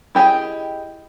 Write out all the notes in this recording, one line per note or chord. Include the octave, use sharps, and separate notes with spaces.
E4 G4 G#4 D#5 G5